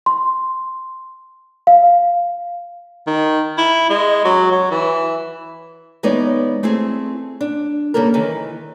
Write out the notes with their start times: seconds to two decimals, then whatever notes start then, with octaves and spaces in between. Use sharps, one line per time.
0.06 C6
1.67 F5
3.07 D#3
3.58 E4
3.90 G#3
4.25 F#3
4.52 F#3
4.71 E3
6.03 E3 G#3 B3 D#4 C#5 D5
6.63 A3 C4 E4 G#4
7.41 D4
7.94 C#3 G3 A#3 A4 A#4
8.14 D#3 E3